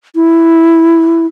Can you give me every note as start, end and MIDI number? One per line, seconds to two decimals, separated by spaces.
0.16 1.26 64